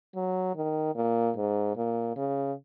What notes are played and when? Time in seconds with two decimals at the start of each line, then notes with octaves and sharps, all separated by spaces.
0.16 F#3
0.55 D#3
0.95 A#2
1.36 G#2
1.77 A#2
2.16 C#3